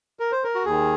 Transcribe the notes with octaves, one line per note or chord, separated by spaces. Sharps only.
A#4
C5
A#4
F#4
D#2 D#3 G#4